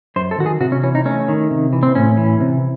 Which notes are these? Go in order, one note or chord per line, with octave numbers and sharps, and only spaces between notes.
F#2 C5
A4
D#3 F#4
G#4
C3 F#4
C#4
E3 C#4
D#4
A3 C#4
D#3
C3
E3
C4
A2 C#4
E3
C3